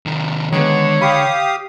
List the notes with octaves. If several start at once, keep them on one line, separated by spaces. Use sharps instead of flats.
C3 D#3
D3 D#3 G#3 B3 C#5
G4 F5 B5 D#6